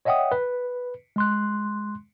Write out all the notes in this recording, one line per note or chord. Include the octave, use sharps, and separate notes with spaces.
C#5 D#5 E5 F#5 G5 D#6
B4
G#3 C6 F#6